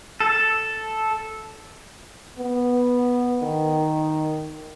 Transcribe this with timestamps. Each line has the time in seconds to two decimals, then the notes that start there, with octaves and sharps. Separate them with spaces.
0.20 A4
2.39 B3
3.43 D#3